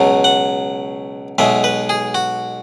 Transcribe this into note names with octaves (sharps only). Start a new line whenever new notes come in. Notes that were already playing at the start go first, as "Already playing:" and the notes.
Already playing: C#2 B2 F#3
F#5
B1 B2 G#3 E5
B4
G#4
F#4